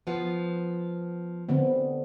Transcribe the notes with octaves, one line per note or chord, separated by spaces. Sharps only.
F3 B3
D3 B3 C4